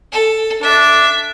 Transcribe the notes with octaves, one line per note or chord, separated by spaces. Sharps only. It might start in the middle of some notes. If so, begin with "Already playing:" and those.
A4
D4 E5